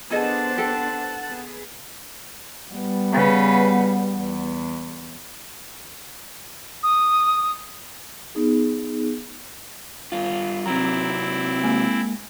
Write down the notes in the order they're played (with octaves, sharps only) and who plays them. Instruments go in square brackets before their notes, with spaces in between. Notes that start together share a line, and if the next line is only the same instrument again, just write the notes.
[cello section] B3 D4 C5 [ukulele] G#4 A4 D#5 [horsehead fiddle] F#5 A5
[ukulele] G4 A4
[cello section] B3 G#4 B4
[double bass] G3 B3
[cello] C#3 B4
E2
[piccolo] D#6
[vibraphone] B3 D#4 G#4
[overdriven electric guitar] G2 F4
[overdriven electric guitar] C3 F#3 [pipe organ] C4 E4 [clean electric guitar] A#5
[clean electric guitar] G#3 A#3 G#5